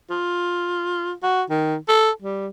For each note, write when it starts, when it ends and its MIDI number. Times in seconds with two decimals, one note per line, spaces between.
0.10 1.13 65
1.23 1.42 66
1.50 1.76 51
1.88 2.11 69
2.22 2.48 55